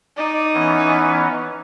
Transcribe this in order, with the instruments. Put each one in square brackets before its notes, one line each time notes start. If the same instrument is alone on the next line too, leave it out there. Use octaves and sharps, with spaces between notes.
[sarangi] D#4 [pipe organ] D5
[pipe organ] E3 B3 C#4